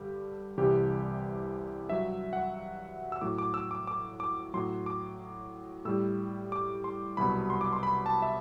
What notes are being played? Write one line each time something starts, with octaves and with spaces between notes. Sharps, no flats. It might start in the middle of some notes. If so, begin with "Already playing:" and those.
Already playing: G2 D3 G3 G4
C2 C3 E3 G3 G4
G2 F#3 E5
F#5
E6
A2 F#3 D6
D6
E6
D6
D6
D6
A2 F#3 C6
D6
A2 G3 E6
D6
C6
C2 B2 F#3 B5
C6
D6
C6
B5
A5
E5